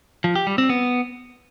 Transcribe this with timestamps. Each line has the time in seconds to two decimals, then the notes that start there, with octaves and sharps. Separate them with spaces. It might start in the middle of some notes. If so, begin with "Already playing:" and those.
0.24 F3
0.35 G4
0.47 G3
0.58 C4
0.69 B3